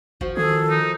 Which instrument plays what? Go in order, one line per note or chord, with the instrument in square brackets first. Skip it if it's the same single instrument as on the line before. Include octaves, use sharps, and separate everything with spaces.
[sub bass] G#1 [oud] F3 F#4
[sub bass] D#3 [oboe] G#4 [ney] A4
[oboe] D#4